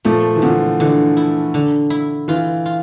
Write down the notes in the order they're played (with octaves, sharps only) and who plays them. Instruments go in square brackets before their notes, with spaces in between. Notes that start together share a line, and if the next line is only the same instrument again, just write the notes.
[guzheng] A#2 [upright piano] F3 A3
[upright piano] E3
[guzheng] A#2 [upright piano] D3 F3
[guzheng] D3 [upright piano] E3
[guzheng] E4
D3
E4
[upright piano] E3 [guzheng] F4
[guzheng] F4